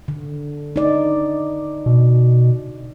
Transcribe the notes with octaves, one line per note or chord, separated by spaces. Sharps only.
D3
D#4 D5
B2